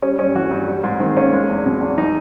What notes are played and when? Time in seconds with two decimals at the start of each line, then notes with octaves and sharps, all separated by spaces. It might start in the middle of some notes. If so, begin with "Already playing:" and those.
0.02 G3 C#4
0.19 G2 C#4
0.35 E3 F#4
0.51 G2
0.68 G3
0.83 G#2
1.00 D#3 C4
1.17 A#3 C#4
1.33 G#3
1.49 E2
1.66 B2
1.81 E2
1.97 E3 D#4